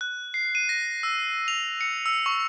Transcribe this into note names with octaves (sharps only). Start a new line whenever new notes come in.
F#6
C7
D#7
A#6
E6
F7
C#7
E6
C#6